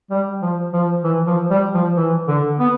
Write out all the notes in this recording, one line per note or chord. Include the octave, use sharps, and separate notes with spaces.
G3
F3
F3
E3
F3
G3
F3
E3
D3
B3